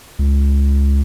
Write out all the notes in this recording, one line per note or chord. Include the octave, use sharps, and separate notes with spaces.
C#2